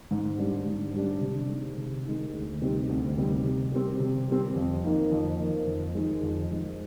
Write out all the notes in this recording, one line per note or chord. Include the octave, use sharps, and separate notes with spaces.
G#2
G3 D4
G#2
G3 D4
C3
D#3 G#3
C3
D#3 G#3
D2
C3 G3 C4 D#4
D2
C3 G3 C4 D#4
C3
G3 C4
C3
G3 C4
F2
D#3 A#3 D#4
F2
D#3 A#3 D#4
F2
D#3 G#3
F2
D#3 G#3